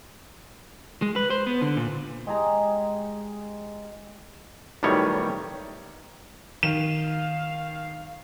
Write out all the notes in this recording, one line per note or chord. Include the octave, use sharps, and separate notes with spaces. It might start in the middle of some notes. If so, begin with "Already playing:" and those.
G#3
B4
C5
B3
D3
A#2
G#3 G4 G#4 A#5
B1 A2 D#3 G3 C#5
D#3 F5 E7